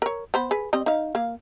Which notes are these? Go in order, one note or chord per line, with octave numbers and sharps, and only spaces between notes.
A#4 C#5
B3 C5 B5
G#4 B4
G3 C4 D#5
D#4 F5
A#3 F5